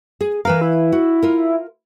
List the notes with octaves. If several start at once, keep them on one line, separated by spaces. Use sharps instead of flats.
G#4
E3 A#4 B4 F5
E4
F#4
F4 A#4